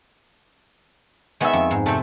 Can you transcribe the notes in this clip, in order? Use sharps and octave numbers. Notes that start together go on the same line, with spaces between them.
D#3 G#3 B3 E5
F2
G#2
C3 A3 C4 A4